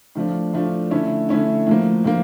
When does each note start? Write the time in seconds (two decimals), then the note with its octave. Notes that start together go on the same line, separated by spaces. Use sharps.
0.15 A2 F3 A3 D4 F4
0.53 A2 F3 A3 D4 F4
0.91 D3 A3 C#4 E4
1.29 D3 A3 C#4 E4
1.67 A2 F3 A#3
2.04 A2 F3 A#3